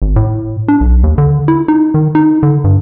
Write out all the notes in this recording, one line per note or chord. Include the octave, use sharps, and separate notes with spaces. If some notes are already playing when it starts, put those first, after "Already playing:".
G#1
A2
D4
B1
D#2
D3
E4
D#4
D#3
D#4
D3
G2